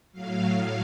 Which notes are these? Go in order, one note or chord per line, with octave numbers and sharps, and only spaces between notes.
A2 F#3 F5